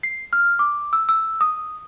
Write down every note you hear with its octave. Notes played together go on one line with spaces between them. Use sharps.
C7
F6
D6
E6
E6
D#6